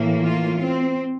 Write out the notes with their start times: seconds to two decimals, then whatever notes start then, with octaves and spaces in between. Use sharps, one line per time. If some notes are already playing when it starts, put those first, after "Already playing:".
Already playing: A2 E3 A#3
0.22 F4
0.60 C4